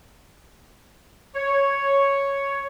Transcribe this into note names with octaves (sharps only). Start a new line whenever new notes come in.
C#5